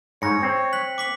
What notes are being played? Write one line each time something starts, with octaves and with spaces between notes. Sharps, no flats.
G#2 C#5 A#6 C#7
C4
F#6 B6 F#7
D6 B6 F#7